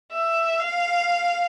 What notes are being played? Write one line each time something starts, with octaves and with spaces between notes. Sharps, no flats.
E5
F5